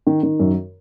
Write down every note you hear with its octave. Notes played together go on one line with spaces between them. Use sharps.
D#3
D#3
F#2